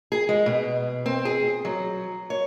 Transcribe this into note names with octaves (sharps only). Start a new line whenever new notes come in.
G#4
G#3
B2
C4
G#4
F#3
C#5